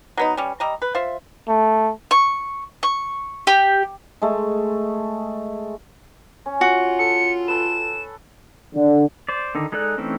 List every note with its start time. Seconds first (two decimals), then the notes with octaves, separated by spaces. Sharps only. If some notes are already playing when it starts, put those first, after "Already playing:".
0.17 F#3 B3 D#4
0.37 G3 C#4
0.60 G3 D#5 A#5
0.82 B4
0.95 F4 C5 E5
1.48 A3
2.11 C#6
2.83 C#6
3.47 G4
4.22 G#3 A3
6.46 C#4
6.61 F4 F#4
6.99 A4 C#7
7.48 A4 B4 E7
8.74 D3
9.29 C5 D5
9.55 D3 D#3 D#4
9.72 G#3 D#4 A4 D5 F#6
9.98 E3 A3 C4 C#4 D#4